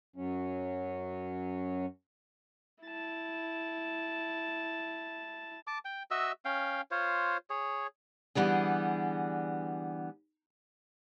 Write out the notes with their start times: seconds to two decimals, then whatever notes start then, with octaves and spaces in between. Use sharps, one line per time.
0.16 F#2 F#3 C#4
2.84 E4 A5
5.67 A5 D6
5.85 G5
6.11 F#4 D#5 E5 E6
6.45 C#4 F5 G5
6.91 F4 C5 C#5
7.50 G#4 C#5
8.35 D3 E3 G3 B3 G#4